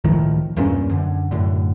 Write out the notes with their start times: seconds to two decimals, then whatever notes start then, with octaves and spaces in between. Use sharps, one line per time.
0.04 C#2 A2 D#3 F3
0.56 E2 G2 A#2 C#4
0.90 F#2 D3
1.31 F#2 A2 D3